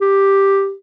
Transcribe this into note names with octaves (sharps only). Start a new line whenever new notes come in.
G4